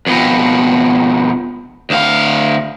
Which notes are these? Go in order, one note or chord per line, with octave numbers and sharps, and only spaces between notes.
F2 B2
D2 F5